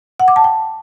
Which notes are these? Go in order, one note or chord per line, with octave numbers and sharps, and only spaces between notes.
F#5
D6
A5
G5